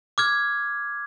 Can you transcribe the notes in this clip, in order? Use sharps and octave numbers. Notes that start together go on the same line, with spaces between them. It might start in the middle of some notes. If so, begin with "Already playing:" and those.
D6 F6 G#6